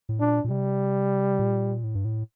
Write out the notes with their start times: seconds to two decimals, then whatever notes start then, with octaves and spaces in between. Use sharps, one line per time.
0.09 A2
0.20 A#2 D4
0.44 A#2
0.50 C3 G3
1.39 A#2
1.84 A2
1.95 G2
2.05 A2